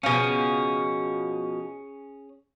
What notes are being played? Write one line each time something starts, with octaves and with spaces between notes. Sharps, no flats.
B2 F3 C#4 G#4